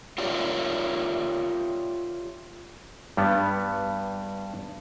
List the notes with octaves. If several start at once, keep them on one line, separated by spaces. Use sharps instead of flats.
F4 G4 A#4 C#5 D5 E5
G2 G3 B3